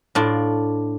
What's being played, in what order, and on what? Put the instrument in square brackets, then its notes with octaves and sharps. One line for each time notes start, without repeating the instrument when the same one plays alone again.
[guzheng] A2 D4 F4